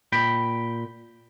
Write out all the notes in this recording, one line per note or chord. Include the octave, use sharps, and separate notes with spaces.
A#2 G5 B5